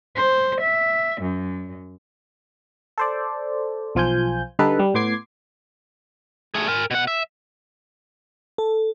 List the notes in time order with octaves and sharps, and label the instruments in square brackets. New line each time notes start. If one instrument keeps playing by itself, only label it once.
[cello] C5
E5
F#2
[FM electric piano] A4 C5 D5
B1 F3 F4 G#5 G6
D3 G3 D#4 A4 B4
G3
A2 B3 C6 D6 G#6 C7
[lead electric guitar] A3 G#4
A#4 G#5
B2 F#5
E5
[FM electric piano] A4